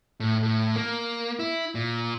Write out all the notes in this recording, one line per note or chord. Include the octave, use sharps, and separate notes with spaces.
A2
A2
A#3
E4
A#2